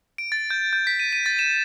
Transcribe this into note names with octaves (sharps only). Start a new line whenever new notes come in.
D7
A6
G6
G6
B6
D#7
D#7
A6
E7